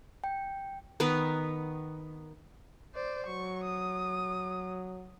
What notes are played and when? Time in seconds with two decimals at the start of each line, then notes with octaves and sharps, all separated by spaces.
0.24 G5
1.00 D#3 B3 A#4 B4
2.95 C5 D5
3.27 F#3 C#6
3.65 D#6